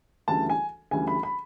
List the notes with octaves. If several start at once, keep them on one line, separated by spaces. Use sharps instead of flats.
D2 C#3 E3 G3 A5
G#5
D2 C#3 E3 G3 G#5
B5
B5